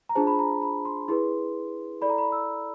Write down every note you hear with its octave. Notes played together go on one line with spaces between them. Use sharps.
A#5
D4 F4 G#4 C5 A5
B5
A#5
B5
C6
E4 G#4 B4 C6
E4 A4 D5 B5
A#5
B5
E6